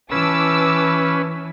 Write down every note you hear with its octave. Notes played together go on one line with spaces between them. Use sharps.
E3 C#4 B4 A5 D6 E6